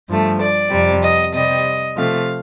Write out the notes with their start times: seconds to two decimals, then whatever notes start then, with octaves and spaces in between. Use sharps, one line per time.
0.09 G2 F3 A3
0.40 D5
0.71 F2 C3 G3
1.02 D#5
1.33 C3 G3 D#5
1.96 C3 F3 A3 F5